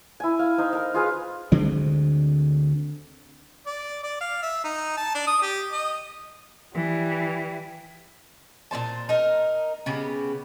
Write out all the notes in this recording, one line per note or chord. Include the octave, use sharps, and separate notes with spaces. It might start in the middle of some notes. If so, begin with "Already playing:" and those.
E4 G#5
F5
D#4 C5
A#4 F5
F4 G#4 B4
D2 D3 G#3 C4
D5
D5
F5
E5
D#4
A5
D4
D#6
G4
D#5
E3 G3
A#2 C#4 C5 A5
D#4 A#4
C#3 B3 G4